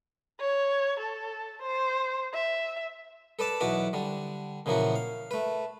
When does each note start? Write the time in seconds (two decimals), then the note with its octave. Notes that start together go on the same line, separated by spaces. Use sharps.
0.40 C#5
1.00 A4
1.62 C5
2.34 E5
3.39 A4 B4 D5 A5
3.60 B1 E2 F#4 B4 D6
3.93 D3 G3
4.66 A#2 C#3 E3 F3 A#3 F#4
4.96 F5
5.31 A3 B4